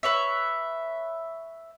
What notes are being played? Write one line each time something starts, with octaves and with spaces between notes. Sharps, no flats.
B4 C#5 E5